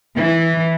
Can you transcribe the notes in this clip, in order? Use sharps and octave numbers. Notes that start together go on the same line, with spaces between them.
E3